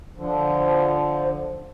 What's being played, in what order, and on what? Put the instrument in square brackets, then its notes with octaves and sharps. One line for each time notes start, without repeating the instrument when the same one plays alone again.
[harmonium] D3 F3